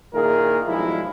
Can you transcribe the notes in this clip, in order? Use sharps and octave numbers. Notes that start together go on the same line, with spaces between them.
A#2 D#3 E4 F4 G#4 A#4
B1 G2 F3 G#3 E4